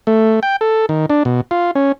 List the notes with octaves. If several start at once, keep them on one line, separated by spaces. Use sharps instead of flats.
A3
G5
A4
D#3
D4
B2
F4
C#4